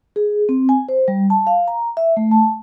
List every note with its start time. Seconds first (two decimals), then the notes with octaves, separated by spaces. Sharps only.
0.16 G#4
0.49 C4
0.69 G#5
0.89 C5
1.08 G3
1.30 A5
1.47 F5
1.68 A#5
1.97 E5
2.17 A3
2.31 A5